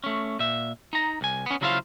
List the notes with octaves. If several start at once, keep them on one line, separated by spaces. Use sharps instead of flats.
A3 C#4
A#2 E5
D#4 A#5
C2 G#5
B3 C#4
C#3 F#3 E4 F4 C5 F5